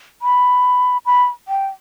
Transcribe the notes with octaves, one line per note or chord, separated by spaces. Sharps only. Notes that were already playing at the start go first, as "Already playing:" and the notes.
B5
B5
G5